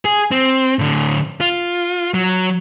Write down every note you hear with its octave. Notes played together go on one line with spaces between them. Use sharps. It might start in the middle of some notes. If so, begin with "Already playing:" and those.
G#4
C4
A2 D3
F4
F#3